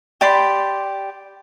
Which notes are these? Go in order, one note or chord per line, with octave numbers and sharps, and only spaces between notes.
G4 D5 B5 C6